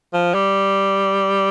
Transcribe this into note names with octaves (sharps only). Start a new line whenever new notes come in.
F3
G3